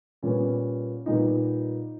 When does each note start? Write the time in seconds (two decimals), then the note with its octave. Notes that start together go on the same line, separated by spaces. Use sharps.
0.22 A#2 G3 B3 C#4
1.06 A#2 G3 B3 D#4